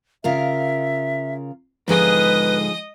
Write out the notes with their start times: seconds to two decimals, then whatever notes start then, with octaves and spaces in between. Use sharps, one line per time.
0.24 C#3 F4 A#4 E5
1.88 G#2 D3 F3 G#3 G#4 B4 D#5 D#6